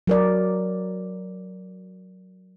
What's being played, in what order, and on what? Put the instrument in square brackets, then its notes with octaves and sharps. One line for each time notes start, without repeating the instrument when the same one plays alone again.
[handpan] F#3 A#4 D5